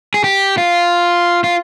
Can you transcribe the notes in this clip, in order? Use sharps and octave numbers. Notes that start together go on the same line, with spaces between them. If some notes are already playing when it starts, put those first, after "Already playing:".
G#4
G4
F4
F4